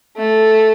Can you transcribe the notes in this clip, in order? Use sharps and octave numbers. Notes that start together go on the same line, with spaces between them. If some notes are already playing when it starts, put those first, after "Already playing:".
A3